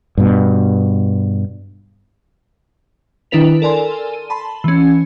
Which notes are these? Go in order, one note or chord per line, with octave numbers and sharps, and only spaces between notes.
G2 B2
D#3 D4 E4 B4 B6 F7
A4 A#4 D5 G#5 C6
D#7
A5 B5 C6
E3 C#4